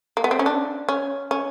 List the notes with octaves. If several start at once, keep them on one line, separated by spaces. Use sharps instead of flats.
A#3
B3
C4
C#4
D4
C#4
C#4